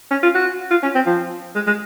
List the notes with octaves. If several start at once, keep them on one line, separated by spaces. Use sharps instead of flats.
C#4
F4
F#4
F4
C#4
C4
F3
G#3
G#3